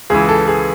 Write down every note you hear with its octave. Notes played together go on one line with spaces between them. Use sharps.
C#2 C#3 E3 G#4
A4
G#4